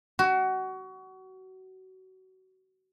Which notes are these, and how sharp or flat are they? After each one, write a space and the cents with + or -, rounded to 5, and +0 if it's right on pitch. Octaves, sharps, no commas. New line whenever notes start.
F#4 +25